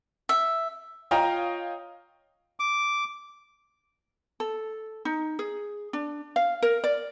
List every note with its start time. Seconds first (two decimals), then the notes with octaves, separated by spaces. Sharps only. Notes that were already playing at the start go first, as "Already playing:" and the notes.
0.29 E5
1.11 F4 C#5 D#5 F5 G5 A#5
2.60 D6
4.40 A4
5.05 D#4
5.39 G#4
5.93 D4
6.36 F5
6.62 A#4
6.84 D5